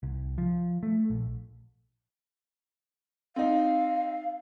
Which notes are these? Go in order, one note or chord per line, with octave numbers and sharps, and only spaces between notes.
C2
F3
A3
A#1
C4 D#4 F5